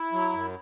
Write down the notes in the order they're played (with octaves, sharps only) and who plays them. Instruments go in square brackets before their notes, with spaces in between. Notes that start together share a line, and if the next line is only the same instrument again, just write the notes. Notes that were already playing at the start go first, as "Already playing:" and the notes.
Already playing: [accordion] E4
F#3
F#2